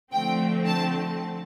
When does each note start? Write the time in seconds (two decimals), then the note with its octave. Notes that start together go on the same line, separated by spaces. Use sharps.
0.12 D3 F3 A3 C4 G5
0.65 A5